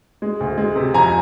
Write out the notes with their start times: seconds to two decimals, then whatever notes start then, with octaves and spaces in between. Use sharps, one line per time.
0.22 G#3
0.40 D2
0.58 G#3
0.76 C3
0.94 F2 G#5 A#5